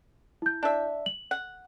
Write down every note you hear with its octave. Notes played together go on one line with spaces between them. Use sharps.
E4 G6
D4 E5
F#7
F#5